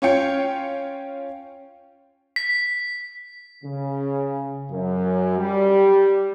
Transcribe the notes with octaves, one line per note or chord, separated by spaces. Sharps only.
C#4 F4 C#5 F5 G5 C#7
B6
C#3
F#2
G3